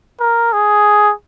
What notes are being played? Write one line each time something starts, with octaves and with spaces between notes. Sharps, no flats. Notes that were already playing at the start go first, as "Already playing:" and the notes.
A#4
G#4